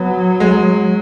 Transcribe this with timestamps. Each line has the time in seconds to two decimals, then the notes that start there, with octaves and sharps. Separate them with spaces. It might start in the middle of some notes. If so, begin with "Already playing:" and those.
Already playing: F#3 B3
0.40 G#3